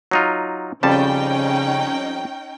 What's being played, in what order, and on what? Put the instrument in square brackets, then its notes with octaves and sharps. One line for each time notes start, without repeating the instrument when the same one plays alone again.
[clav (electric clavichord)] F#3 D#4 F4
[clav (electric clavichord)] F2 G3 A5 [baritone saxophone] C#3 [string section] C#4 D#4 G5